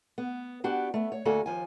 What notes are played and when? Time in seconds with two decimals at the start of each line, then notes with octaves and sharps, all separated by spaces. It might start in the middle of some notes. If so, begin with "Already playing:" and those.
0.18 B3
0.64 B3 D4 F#4 G4
0.94 A3 B3
1.12 C#5
1.25 D2 A#3 F#4 A4 G#5
1.46 D#2 F3 G#5